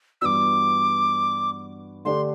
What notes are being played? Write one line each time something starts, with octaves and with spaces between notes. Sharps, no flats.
G2 E3 B3 D4 F#4 D6 E6
D3 A3 D4 G4 D5 C6